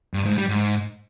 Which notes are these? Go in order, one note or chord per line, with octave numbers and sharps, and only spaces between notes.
G2
G#2
G3
G#2